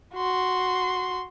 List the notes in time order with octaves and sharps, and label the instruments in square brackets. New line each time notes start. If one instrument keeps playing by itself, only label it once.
[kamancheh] F#4 C6